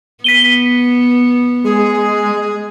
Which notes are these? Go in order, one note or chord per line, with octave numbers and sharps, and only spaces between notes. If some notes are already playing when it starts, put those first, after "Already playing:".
B3 B6 D#7 G7
G#3 G#4